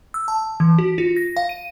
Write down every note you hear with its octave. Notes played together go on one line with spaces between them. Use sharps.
E6
A5
E3
F#4
F4
A#6
F5
D#7